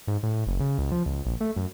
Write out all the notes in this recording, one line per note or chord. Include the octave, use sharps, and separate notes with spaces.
G#2
A2
F#1
C#3
C#2
F3
C#2
A#1
A3
F#2